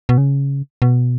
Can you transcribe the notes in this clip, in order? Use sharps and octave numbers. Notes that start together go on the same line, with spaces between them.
B2
C#3
B2